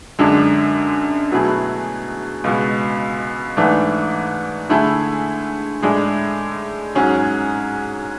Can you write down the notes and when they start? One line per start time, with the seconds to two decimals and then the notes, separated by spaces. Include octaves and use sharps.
0.19 F#2 D3 G#3 D4
1.31 B2 F#3 A3 E4 G#4
2.44 C#2 B2 G#3
3.57 G#2 E3 A3 D4
4.70 D3 A3 E4 G#4
5.82 A2 G#3 D4 G#4
6.95 G#2 F#3 C#4 G#4